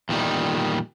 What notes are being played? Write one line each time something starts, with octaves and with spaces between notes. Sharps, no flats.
E2 A#2 D#3 G3